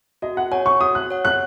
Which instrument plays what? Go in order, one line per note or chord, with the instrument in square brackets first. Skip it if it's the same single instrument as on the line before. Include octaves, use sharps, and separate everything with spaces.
[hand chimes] F#4 [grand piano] D#5
[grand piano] F#5
[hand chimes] C#5 F#5 [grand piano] G#5
[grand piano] C#6
[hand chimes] F#4 [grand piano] D#6
[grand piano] F#6
[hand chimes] C#5 F#5
[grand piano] F#6